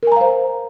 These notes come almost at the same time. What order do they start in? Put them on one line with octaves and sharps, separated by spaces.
A#4 G#5 A#5 F5 C5